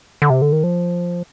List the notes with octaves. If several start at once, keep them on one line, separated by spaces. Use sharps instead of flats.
D3
C3
D3
D#3
F3